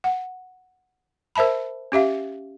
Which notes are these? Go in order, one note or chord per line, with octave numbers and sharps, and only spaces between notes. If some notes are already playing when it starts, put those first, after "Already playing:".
F#5
A#4 C5 E5 A5 B5
C#4 G4 E5 F5